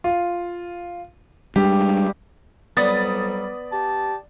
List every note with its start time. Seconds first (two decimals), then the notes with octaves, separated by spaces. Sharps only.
0.04 F4
1.56 G3 G#3 D4 G4
2.77 F2 F#3 G3 B3 D5 D#6 A6
3.71 G4 A5